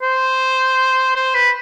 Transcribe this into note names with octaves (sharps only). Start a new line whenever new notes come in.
C5
C5
B4